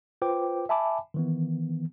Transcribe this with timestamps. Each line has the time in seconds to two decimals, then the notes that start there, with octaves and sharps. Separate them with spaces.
0.22 F4 B4 C5 G5 D6
0.69 E5 G#5 A5 B5 D6
1.14 D#3 E3 B3